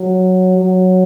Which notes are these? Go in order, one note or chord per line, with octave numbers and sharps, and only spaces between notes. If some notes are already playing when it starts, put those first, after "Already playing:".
Already playing: F#3
F#3